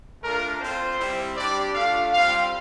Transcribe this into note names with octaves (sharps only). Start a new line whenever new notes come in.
A3 D4 F4 A#4
C4 F4 C5
G3 C4 E4
G3 D4 G4 D5
A3 D4 F4 F5
G3 C4 F4 F5